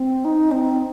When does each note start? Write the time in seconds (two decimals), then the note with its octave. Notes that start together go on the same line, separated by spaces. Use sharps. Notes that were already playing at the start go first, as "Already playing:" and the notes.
Already playing: C4
0.25 D#4
0.51 C4